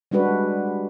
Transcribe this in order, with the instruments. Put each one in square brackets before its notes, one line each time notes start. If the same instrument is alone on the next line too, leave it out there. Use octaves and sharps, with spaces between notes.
[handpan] G3 G#3 D4 F#4 B4